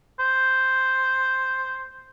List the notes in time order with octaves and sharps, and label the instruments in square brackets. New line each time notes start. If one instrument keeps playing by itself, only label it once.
[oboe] C5